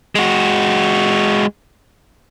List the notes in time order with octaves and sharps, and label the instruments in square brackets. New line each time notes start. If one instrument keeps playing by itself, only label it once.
[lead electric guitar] G#3 F#4